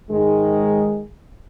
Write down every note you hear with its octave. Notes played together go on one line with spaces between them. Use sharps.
G#2 D#3 G#3